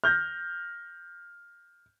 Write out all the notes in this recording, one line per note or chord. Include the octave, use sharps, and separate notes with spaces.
F6 G6 A#6